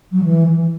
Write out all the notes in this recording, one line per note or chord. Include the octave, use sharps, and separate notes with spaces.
F#3
E3